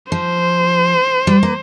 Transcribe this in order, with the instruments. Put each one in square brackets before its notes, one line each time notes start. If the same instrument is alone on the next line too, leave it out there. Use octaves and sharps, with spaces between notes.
[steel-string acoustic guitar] F3 [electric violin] C5
[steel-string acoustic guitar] G3
A#3